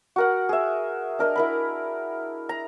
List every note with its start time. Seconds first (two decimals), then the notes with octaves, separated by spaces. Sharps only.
0.16 F#4 A#4 F#5
0.49 G#4 E5
1.19 D4 A#4 D#5
1.36 E4 A#4 B5
2.49 A#5